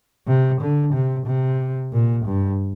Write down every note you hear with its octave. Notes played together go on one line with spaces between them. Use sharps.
C3
D3
C3
C3
A#2
G2